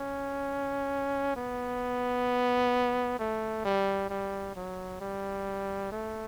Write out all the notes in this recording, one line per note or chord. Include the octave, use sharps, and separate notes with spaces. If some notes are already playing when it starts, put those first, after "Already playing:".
Already playing: C#4
B3
A3
G3
G3
F#3
G3
A3